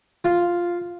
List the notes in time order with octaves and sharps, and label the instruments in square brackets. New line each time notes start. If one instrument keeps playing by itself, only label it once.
[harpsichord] F4